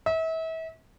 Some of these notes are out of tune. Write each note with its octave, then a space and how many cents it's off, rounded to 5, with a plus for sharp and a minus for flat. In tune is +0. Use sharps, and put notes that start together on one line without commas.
E5 -35